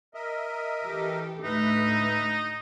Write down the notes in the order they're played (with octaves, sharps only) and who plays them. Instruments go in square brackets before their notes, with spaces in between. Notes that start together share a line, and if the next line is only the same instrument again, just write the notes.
[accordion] A#4 D#5 E5
[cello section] E3 G4 A4
[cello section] D2 A2 A3 [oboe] D#4 [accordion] B4 E5